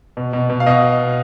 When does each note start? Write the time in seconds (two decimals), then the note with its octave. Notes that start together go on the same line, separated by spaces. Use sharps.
0.17 B2
0.33 B2
0.50 B2
0.60 F5
0.66 B2 D#5